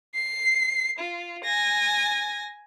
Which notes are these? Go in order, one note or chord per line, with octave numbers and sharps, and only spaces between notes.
C7
F4
G#5 A#6